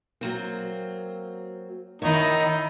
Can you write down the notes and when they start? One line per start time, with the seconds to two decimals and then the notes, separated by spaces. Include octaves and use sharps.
0.21 F#3 A#3 C4
2.02 D#3 D#4 E4 C#5